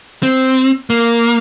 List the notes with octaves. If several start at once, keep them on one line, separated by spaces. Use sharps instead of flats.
C4
A#3